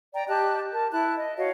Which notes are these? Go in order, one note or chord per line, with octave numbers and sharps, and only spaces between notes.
D5 G5 A#5
G4 D#5 A5 F#6
A#4 A5
E4 A5 F#6
D#5
F#4 C#5 D#5 F5